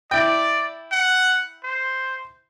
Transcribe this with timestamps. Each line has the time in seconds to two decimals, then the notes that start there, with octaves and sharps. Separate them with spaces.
0.11 E4 D5 G5
0.92 F#5
1.64 C5